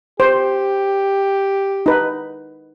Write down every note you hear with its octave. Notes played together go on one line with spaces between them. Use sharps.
G4 C5
D#4 B4